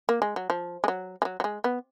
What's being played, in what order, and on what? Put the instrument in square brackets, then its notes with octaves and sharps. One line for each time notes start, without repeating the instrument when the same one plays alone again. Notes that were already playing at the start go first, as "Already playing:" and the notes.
[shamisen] A#3
G#3
F#3
F3
G#3
F#3
G#3
F#3
F#3
G#3
B3